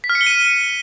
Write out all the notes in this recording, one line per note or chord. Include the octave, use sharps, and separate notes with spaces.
B6
F6
C#7
G7
D#7